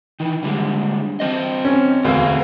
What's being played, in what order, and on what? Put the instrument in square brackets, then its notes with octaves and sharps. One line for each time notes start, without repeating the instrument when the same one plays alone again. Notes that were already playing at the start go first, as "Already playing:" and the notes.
[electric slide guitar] D#3 E3
D3 G3 G#3
C4 C5 D#5
[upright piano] C#4
[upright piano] E1 D2 [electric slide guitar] A#4 B4 F5